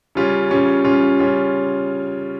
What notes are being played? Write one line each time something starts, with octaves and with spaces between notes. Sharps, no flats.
C#3 G3 C#4 F4
C#3 G3 C#4 F4
C#3 G3 C#4 F4
C#3 G3 C#4 F4